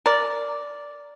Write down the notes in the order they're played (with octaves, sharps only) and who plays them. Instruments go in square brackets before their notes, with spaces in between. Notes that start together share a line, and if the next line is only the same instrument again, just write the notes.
[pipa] A#4 D5